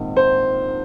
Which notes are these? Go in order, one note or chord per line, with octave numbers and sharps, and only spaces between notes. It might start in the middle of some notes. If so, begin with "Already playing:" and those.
Already playing: A#1 G#2 D#3 C4
C5